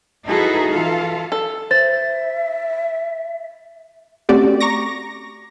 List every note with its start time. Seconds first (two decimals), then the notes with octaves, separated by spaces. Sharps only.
0.25 D#4 E4 F#4 G#4 A4 B4
0.67 E3 F4 A4 F5
1.32 A4
1.71 C5 E5 A6
4.29 A3 C4 C#4 F#4 G4 D5
4.60 A#5 C#6 D6 A#6